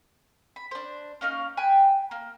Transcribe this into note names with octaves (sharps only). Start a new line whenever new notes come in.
B5
D4 C5
A#3 C#4 D#4 F5
G5 G#5 B5 F#6
A#3